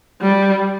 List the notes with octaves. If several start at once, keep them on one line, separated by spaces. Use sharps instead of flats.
G3